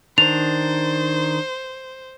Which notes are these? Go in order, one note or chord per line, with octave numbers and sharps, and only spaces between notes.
D#3 D4 C5 F7